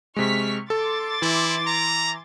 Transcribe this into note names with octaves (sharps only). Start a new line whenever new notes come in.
C3 G#3 C#6 F6 B6
A4 C6 D6 A6
E3 E4
A#5